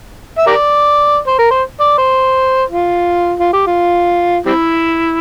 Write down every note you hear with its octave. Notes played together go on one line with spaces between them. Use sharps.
E5
G4 A#4 D5
C5
A#4
C5
D5
C5
F4
F4
G4
F4
G3 C4 E4